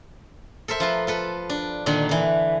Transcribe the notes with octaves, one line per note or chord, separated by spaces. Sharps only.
A4 A#4 C5 E5
F3 F4 B4
F4 A4 B4
D4
A#2 D3 D#3 D4
D3 E3